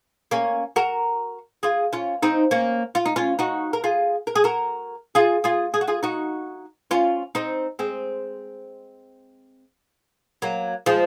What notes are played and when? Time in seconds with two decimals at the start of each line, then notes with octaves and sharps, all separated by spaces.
0.31 A#3 C#4
0.76 F#4 A#4
1.63 F4 G#4
1.93 C#4 F4
2.23 C4 D#4
2.51 A#3 C#4
2.95 F4
3.06 D#4
3.16 C#4 F4
3.39 D#4 F#4
3.73 A#4
3.84 F4 G#4
4.27 A#4
4.36 G#4
4.44 F#4 A#4
5.15 F4 G#4
5.44 F4 G#4
5.74 G#4
5.81 F#4
5.88 F4 G#4
6.03 D#4 F#4
6.91 C#4 F4
7.35 C4 D#4
7.79 G#3 C4
10.42 F#3 A#3
10.86 F3 G#3